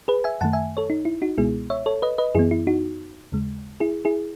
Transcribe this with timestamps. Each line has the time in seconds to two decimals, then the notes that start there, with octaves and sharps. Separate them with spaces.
0.08 G#4 B4
0.24 E5 G#5
0.41 F#2 D#3 A3 F#5 A5
0.53 E5 G#5
0.77 A4 C#5
0.90 D#4
1.05 E4
1.22 D#4 F#4
1.38 C#2 B2 G#3 B3 E4 G#4
1.70 C#5 E5
1.86 A4 C#5
2.02 B4 D#5
2.18 B4 D#5
2.35 F#2 E3 B3 E4 G#4
2.51 E4
2.67 D#4 F#4
3.32 D#2 C#3 G#3
3.80 E4 G#4
4.05 E4 G#4